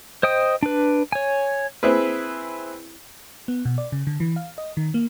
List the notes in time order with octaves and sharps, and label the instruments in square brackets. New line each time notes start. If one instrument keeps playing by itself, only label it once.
[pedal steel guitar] C5 D#5 G5 D#6
D4 B4
C#5 G#5
[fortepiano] C4 E4 G#4 B4
[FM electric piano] B3
B2
D5
C#3
D3
E3
F5
D#5
D#3
A#3